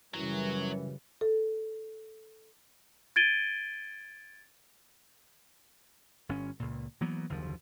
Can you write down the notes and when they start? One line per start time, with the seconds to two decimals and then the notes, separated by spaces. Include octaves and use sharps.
0.14 F#2 C#3 E3 F#3 G3
1.21 A4
3.16 G#6 A6 D7 D#7 G7
6.29 G1 C#4
6.60 C#2 A#2
7.01 E3 F#3 A#3 B3
7.29 F#1 D#2 D3 F3